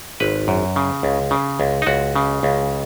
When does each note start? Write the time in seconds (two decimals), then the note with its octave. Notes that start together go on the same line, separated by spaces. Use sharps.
0.20 G#1 B4
0.48 F#2
0.76 C#3
1.03 C#2
1.31 C#3
1.60 C#2
1.82 D#4
1.87 C#2 F#4
2.16 C#3
2.43 C#2